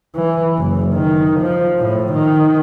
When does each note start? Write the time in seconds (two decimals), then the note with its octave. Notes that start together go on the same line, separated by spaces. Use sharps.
0.15 E3
0.58 F#1
0.94 D#3
1.40 F3
1.79 A2
2.13 D#3